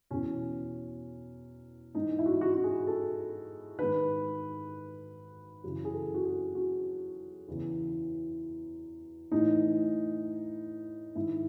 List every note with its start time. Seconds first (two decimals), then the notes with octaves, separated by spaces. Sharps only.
0.11 E2 B2 C#4
1.95 G#2 E3 D#4
2.19 E4
2.26 F#4
2.32 E4
2.41 F#4
2.54 F#4
2.64 G#4
2.87 A4
3.79 G#2 D#3 B4
5.64 F#2 C#3 E3
5.85 G#4
5.94 A4
6.14 F#4
6.25 G#4
6.55 F#4
7.48 E2 C#3 E3
9.31 A2 E3 D#4
11.15 G#2 D#3 E4